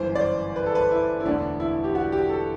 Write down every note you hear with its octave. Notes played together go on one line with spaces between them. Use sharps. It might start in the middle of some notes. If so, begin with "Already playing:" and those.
Already playing: G1 F#2 E3 C5
D5
C5
B4
A4
B4
E4
E4
E1 D2 D3 D4
E4
G4
F#4
G4
A4